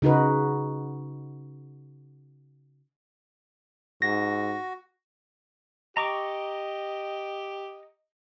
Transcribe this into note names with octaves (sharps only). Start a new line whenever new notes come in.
C#3 D#4 F#4 B4
G#2 F#4 A#6
G4 D#5 A#5 C#6 D6